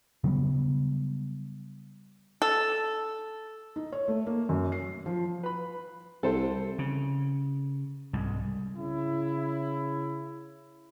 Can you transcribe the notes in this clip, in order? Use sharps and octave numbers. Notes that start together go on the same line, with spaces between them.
C#3 F#3 G3 B3
A4
D#4
C#5
A3
A#3
F#2
C7
F3
B4 B5
C2 A4 C5
C#3
C2 G#2
C#3 E4